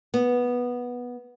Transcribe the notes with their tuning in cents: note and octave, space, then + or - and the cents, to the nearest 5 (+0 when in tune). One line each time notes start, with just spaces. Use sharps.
B3 -10